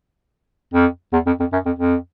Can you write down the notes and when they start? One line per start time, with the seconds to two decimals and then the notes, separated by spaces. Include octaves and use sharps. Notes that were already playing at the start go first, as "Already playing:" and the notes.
0.73 F2
1.13 E2
1.26 F2
1.40 F2
1.52 F#2
1.66 F2
1.79 F2